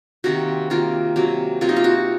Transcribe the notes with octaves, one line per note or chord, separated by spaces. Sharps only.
C3 D#3 A#3 F#4
C3 D#3 A#3 F4
C3 F#3 A#3
C3 F#3 A#3 F4
D#4
F4
F#4